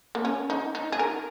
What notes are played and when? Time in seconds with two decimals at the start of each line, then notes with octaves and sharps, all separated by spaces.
0.15 A#3
0.25 C#4
0.50 D#4
0.75 D#4
0.92 G#4
0.99 A#4